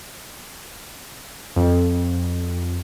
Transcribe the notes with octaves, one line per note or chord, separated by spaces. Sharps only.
F2